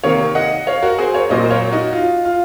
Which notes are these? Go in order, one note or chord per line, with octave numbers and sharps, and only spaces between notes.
C3 D#3 A#3 C#5 F5
D#5 F#5
C#5 F5
F#4 A#4
G#4 C5
A#4 C#5
A#2 F#3 A#3 C5 D#5
C5
A#4 C#5
D#4 F#4
F4
F4